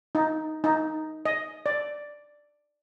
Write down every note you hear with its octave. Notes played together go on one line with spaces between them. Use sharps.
D#4
D#4
D#5
D5